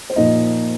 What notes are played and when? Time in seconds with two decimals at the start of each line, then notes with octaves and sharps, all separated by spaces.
0.10 C5
0.16 A#2 F3 A#3 D#4 D#5